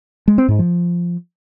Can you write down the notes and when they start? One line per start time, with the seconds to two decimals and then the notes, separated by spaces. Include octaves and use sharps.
0.28 G#3
0.38 C4
0.48 G#2
0.59 F3